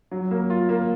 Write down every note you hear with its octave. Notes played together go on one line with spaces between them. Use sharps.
F#3
A#3
F4
A#3